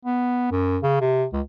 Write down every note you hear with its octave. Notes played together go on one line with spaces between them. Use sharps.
B3
F#2
C#3
C3
C#2